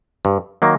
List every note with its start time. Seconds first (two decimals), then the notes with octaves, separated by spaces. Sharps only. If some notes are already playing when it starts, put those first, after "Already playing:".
0.25 G2
0.62 D#3 F#3 A#3